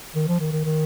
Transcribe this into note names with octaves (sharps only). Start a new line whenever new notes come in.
D#3
F3
D#3
D#3
D#3